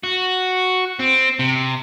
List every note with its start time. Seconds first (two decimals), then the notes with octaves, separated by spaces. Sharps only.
0.04 F#4
1.00 C4
1.39 C3